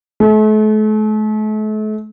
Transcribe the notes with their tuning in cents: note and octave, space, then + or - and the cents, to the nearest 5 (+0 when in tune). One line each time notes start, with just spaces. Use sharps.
A3 -40